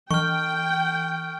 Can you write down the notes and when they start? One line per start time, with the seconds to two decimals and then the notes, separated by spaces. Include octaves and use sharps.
0.11 E3 G5 C#6 F6